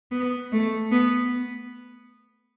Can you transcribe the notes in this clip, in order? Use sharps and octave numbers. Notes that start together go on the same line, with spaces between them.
B3
A3
B3